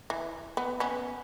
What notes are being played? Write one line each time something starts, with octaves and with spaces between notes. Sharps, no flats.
E3
B3
B3 C#4